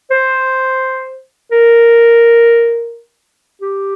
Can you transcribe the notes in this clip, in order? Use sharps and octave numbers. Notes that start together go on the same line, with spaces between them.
C5
A#4
G4